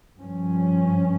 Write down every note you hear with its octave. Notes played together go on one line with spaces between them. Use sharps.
G2 F3 C#4